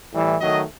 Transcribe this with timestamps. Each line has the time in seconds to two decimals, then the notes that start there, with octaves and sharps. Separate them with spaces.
0.13 A2 E3 G3
0.41 D#3 F#3 A3 D#5